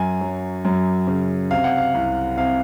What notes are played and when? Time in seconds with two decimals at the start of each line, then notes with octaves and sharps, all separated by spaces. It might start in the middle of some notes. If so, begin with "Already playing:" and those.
Already playing: F#2 G#5
0.21 F#3
0.65 F#2
1.07 C#3
1.51 C3 F5
1.64 F#5
1.77 F5
1.95 C2
2.37 C3 F5